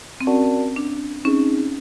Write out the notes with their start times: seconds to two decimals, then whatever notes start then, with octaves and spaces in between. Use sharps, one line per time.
0.21 C4
0.27 C#4 F#4 A#4 D5 F#5 A5
0.76 D4
1.25 C4 C#4 D#4 G#4